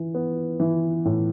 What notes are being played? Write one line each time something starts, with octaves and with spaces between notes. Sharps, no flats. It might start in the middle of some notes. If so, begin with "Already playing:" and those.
Already playing: E3
B3
E3
A2